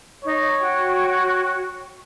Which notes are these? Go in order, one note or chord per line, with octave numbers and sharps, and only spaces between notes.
D#4 C#5
F#4 G5